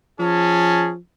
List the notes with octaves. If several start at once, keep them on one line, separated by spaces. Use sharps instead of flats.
F3 C#4 G#4 A5